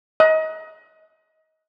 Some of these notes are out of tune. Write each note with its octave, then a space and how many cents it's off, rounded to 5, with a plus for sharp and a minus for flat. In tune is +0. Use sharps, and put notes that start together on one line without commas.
D#5 +25